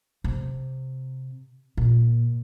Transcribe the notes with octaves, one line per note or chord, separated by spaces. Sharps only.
C3
A#2